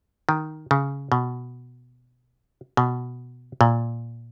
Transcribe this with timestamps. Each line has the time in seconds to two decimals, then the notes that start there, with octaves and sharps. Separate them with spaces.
0.29 D#3
0.71 C#3
1.12 B2
2.77 B2
3.61 A#2